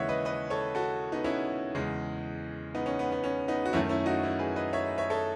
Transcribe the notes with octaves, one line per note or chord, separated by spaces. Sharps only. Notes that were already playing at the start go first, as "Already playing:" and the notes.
Already playing: D#2 C#3 E3 G#3 C#5 E5 F#5
B4 D#5
B4 D#5
A4 C#5
F#4 A4
B3 D#4
C#4 E4
E2 C#3 G#3
B3 D#4
C#4
B3
B3
C#4
B3 D#4
F#4
F#2 D#3 A3 C#4 E4
C#4 E4
D#4 F#4
C#4 E4
G#4 B4
B4 D#5
C#5 E5
C#5 E5
A4 C#5